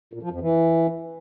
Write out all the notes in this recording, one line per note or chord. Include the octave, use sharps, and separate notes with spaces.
A#2
F3
F2
E3